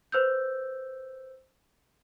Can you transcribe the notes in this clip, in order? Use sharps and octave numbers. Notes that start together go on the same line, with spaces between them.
B4 C5 E6 G6